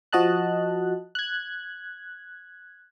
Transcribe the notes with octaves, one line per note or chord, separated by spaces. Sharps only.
F3 F#4 D#5 A5 F#6
F#6 G#6